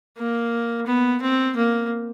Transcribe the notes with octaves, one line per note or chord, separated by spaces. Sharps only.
A#3
B3
C4
A#3